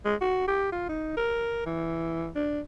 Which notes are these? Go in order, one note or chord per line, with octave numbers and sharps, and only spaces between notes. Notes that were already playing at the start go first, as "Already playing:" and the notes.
G#3
F#4
G4
F4
D#4
A#4
E3
D4